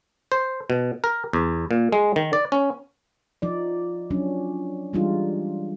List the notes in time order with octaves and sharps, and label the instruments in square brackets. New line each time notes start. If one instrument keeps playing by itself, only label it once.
[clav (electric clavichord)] C5
B2
A#4
E2
A#2
G#3
D#3
D5
C#4
[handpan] F3 D#4 D5
F3 F#3 C#4 D4
E3 G3 G#3 D4 D#4 F4